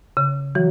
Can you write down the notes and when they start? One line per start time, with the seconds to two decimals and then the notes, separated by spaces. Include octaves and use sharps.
0.17 C#3
0.55 E3 F#3